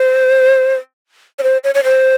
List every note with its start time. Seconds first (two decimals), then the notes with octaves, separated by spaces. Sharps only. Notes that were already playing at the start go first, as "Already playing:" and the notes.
Already playing: C5
1.39 C#5
1.43 C5
1.64 C#5
1.75 C#5
1.84 C5